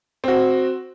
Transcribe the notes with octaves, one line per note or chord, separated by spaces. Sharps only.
C4 F#4